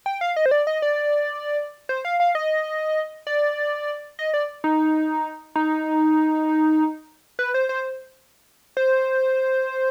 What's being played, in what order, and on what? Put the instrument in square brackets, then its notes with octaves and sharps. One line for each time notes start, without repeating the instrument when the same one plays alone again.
[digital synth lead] G5
F5
D#5
C5
D5
D#5
D5
C5
F5
F5
D#5
D5
D#5
D5
D#4
D#4
B4
C5
C5
C5